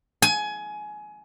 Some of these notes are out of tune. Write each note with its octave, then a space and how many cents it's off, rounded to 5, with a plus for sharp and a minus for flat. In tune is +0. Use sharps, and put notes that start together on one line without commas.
G#5 +20